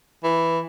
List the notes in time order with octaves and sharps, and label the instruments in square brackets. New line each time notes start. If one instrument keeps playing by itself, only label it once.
[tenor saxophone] E3